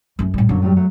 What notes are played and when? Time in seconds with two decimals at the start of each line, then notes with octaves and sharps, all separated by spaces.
0.19 F#2 A3
0.34 A2 G3
0.49 F#2 D3 F#3 A#3
0.62 A2 F#3 G3
0.76 F#3 A3